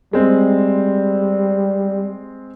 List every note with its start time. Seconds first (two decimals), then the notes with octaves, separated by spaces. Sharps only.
0.13 G3 G#3 C4